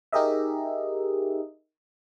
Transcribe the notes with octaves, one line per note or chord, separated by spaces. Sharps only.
D#4 G4 G#4 A#4 D#5 E5